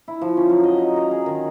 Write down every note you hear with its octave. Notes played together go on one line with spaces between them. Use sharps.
E4
F3
C#4
F#3
D#5
D#4
A#4
G#4
D#3